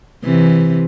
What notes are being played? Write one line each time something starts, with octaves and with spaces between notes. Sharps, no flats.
C3 E3